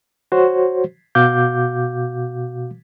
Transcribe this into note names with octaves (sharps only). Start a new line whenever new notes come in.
F#4 C5 C#5
B2 F#4 F5 D6 G6